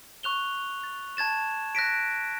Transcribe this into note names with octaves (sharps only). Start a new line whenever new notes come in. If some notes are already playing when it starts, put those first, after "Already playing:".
C#6 F#6 F7 G7
A6
A5 G#6 A6 E7
F#6 A#6 B6 D7